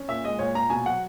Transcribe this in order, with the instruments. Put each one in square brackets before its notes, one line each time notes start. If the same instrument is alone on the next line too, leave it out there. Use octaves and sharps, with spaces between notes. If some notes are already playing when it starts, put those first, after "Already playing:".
Already playing: [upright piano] C#4
A#2 E5
G#3 D#5
A#2 C#5
A#2 A#5
B2 G#5
F#3 F#5